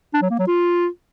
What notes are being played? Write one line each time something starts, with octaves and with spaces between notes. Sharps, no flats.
D4
F#3
A#3
F#3
F4